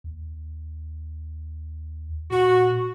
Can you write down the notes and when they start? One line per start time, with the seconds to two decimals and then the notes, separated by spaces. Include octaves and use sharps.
0.04 D#2
2.31 A#2 F#4